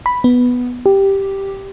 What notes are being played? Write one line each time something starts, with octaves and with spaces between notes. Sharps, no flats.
B5
B3
G4